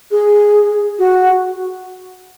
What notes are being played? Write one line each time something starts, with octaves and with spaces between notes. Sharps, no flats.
G#4
F#4